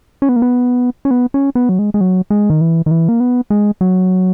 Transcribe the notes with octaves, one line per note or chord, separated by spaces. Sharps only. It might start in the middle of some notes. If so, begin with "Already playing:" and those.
C#4
B3
A#3
B3
C#4
B3
C#4
B3
F#3
G#3
G#3
F#3
G#3
D#3
E3
D#3
E3
A#3
B3
G#3
F#3